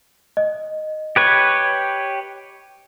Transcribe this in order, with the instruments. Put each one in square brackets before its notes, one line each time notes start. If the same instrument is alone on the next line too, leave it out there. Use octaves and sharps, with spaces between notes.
[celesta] D#5
[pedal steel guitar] G4 B4 C#5